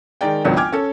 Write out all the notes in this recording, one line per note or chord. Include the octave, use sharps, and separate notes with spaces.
D#3 G#3 A#4 D5 G5
G#1 C#2 F#3 B3 D4
G5 G#5 D6 F6 G#6
C#4 A4